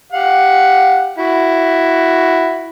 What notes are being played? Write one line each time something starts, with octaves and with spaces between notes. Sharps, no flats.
G4 F5 F#5
E4 F#4